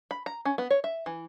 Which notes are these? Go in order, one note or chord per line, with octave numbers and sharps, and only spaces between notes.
B5
A#5
C#4
B3
C#5
E5
E3